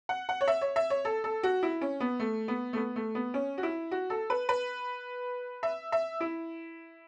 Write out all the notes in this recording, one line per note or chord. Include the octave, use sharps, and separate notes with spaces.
F#5
F#5
C#5
E5
C#5
E5
C#5
A4
A4
F#4
E4
C#4
B3
A3
B3
A3
B3
A3
B3
C#4
F#4
E4
F#4
A4
B4
B4
E5
E5
E4